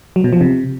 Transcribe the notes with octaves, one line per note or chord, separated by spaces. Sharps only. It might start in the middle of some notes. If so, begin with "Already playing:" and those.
F#3
B2
F3
C3